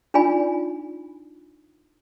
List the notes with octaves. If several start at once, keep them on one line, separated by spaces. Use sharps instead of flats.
D4 D#4 F4 D5 G#5 B5